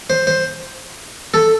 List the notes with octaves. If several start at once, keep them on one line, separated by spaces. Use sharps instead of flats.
C5
C5
A4